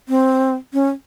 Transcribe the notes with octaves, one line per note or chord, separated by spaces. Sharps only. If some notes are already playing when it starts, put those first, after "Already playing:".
C4
C#4